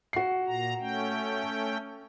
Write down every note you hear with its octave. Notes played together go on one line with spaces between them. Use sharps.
F#4 C7
A#2 A#5
A3 C#4 G5